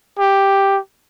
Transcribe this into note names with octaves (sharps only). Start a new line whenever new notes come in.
G4